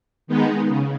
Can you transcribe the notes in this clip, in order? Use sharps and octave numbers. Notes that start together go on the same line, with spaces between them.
D#3 G#3 B3 D#4
C#3